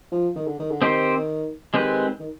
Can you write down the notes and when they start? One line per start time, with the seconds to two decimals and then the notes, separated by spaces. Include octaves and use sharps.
0.12 F3
0.36 D#3
0.47 D3
0.59 D#3
0.71 D3
0.82 D#3 C4 D#4 G4 C5
1.74 D#3 G#3 C4 G4 B4
2.19 D#3